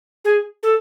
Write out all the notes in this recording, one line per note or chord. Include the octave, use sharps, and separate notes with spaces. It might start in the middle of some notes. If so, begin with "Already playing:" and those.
G#4
A4